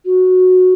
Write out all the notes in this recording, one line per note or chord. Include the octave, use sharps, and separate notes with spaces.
F#4